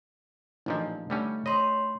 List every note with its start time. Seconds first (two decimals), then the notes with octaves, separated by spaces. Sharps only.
0.66 A1 A#2 F3 D4 D#4
1.10 D3 G3 A3 C#4
1.46 C#5 D#5 B5 C6